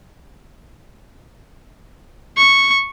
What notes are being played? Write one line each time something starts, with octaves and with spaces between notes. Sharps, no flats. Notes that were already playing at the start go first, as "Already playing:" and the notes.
C#6